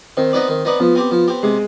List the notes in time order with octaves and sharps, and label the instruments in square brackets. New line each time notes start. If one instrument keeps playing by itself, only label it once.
[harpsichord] D#3 [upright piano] C4
[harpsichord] B3 D#4 B4 D5
D#3
B3 D#4 B4 D5
[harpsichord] F3 [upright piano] B3
[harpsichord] C4 G4
F3
C4 G4
[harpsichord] C3 [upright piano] G#3